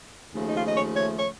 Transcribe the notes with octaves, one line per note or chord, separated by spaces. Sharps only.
D#2 C#3 F3 A3
D#4
F4
D#5
C#5
C#5
C#5